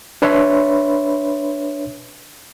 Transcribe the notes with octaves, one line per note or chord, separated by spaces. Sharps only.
D4 B4 C#5 E5 B5 C6